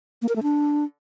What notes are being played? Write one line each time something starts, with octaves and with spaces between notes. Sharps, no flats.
A#3
A#4
A3
D4